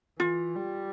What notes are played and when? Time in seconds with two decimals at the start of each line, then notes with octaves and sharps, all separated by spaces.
0.20 E3 F4
0.56 G3